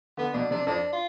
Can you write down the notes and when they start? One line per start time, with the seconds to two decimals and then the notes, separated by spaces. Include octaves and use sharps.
0.17 D3 B3
0.34 B2 D4
0.51 C3 D4
0.67 F2 D4
0.92 F4